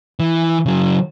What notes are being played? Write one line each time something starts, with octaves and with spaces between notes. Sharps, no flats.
E3
C#3 F#3